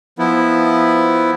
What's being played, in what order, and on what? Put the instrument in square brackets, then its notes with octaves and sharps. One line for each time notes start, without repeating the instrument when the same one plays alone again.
[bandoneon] F3 B3 E4